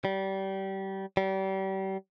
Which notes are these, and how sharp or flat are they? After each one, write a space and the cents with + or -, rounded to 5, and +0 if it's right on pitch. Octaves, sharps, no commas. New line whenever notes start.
G3 -25
G3 -35